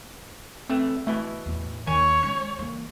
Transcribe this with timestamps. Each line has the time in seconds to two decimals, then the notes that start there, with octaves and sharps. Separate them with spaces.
0.70 A2 E3 A3 C4
1.07 B2 E3 A3 E4
1.46 E2 A2
1.87 D#2 D#3 C#5 G#5
2.23 G#3 C#4
2.59 E3 A#3